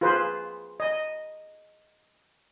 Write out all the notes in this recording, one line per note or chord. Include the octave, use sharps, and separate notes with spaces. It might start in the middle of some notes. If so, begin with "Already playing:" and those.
F4 G#4 B4 C5
D#5